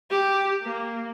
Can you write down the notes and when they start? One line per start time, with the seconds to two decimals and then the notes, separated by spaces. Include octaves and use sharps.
0.10 G4
0.63 A#3